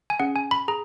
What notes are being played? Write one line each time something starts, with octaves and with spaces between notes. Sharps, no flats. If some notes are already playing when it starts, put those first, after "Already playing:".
G#5
C#4 G#4 F#5
G#5
B5
G#4 A#5